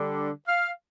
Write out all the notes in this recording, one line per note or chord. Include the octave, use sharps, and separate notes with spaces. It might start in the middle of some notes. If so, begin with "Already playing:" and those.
Already playing: D3 G3 D4
F5